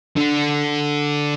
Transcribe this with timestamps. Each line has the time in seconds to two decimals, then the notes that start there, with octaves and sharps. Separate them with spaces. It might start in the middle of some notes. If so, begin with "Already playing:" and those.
0.17 D3